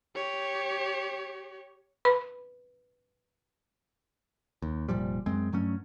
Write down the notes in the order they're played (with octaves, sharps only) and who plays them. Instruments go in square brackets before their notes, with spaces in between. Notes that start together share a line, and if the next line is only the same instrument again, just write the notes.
[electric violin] G4 C#5
[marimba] B4 B5
[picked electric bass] D#2
F1 A#2 F3 G3
F#2 G#3 C4
G2 F#3 A3 C#4